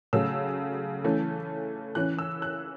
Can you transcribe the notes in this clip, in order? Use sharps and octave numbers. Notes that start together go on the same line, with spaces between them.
C#3 F#3 A3 C#4 E6
E3 A3 C#4
E3 C#4 F#6
E6
F#6